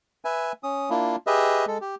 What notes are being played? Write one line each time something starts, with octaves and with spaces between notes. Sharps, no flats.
B4 E5 G#5
C#4 D#6
A#3 D4 E4 F4
G4 G#4 B4 D#5 E5
G#3 A4
G4